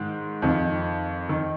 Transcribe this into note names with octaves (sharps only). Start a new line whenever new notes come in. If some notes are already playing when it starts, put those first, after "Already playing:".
Already playing: G#2 D#3
F2 D#3
D#3